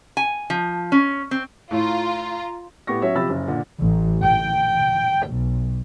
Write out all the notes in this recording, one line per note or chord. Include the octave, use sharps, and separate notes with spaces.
G#5
F3
C#4
C4
A2 F4 A#5
A2 B3 G4 C#6 A#6
F#3 C#4 C#5 E5
C3 F3 G4 B5 E6 A6
F#1 C#3
A#2 D3
A1
G5
B1